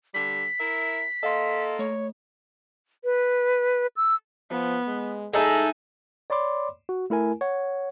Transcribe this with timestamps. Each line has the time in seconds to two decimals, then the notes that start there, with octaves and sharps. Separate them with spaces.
0.14 D3 G3 B6
0.60 E4 A#4 E5
1.23 A#3 A4 D#5 F5 C6
1.79 A3 C#5
3.04 B4
3.97 E6
4.50 F3 B3
4.87 G#3
5.33 G#3 D#4 E4 G#4 A4 G#5
6.30 C#5 D5 B5 C6 D6
6.89 F#4
7.10 A3 E4 A#4 G#5
7.41 C#5 F#5